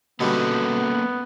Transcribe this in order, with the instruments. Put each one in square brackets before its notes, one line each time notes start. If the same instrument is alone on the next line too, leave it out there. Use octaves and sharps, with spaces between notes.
[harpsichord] B2 D3 G3 [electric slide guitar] A#3 C#4 A4 [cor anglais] B3